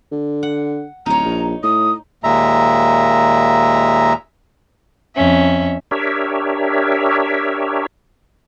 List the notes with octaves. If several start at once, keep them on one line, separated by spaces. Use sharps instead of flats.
D3
F#5
D1 D#4 C#5 A#5
A#1
A2 D#6
D#2 A#2 G#3 E5 A#5
F2 C#4 E5
D4 G4 A#4 C#5 E5